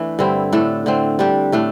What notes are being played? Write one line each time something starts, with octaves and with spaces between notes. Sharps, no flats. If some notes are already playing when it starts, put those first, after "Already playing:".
Already playing: E3 A3 D4
G2 D3 C4 E4
A2 A3 D4 A4
D3 A3 C4
G3 D4 G4
A2 A3 D4